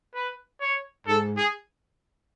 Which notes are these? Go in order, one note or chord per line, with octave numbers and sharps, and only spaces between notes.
B4
C#5
G#2 A4
G#4